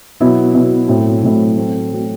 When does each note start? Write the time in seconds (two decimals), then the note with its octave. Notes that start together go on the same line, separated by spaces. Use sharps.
0.20 B2 F#3 B3 E4
0.54 B2 F#3 B3 E4
0.88 A2 F#3 A3 C4 E4
1.23 A2 F#3 A3 C4 E4
1.57 F#3 A3 C4
1.92 F#3 A3 C4